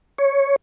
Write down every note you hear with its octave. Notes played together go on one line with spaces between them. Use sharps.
C#5